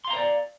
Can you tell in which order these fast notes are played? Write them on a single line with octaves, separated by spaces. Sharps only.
C6 F5 A#5 C5 D5